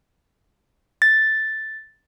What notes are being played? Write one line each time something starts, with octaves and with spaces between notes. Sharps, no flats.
A6